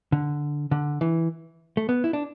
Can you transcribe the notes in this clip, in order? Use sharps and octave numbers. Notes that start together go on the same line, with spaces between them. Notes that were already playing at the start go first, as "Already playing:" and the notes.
D3
D3
E3
A3
B3
E4
D4